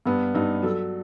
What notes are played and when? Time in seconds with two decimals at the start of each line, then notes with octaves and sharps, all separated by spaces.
0.06 G2 B3
0.35 G2 D#4
0.62 F#3 A4